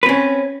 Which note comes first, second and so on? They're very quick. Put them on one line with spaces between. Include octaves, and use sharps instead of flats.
B4 C4 C#4